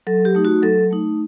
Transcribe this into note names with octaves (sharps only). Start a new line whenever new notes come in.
F#3 A4
G4
A3 D#4
F#4
F#3 A4
A3 D#4